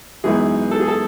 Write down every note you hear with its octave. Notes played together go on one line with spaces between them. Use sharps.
F#2 E3 G#3 B3 D#4 G#4
A4
G#4
A4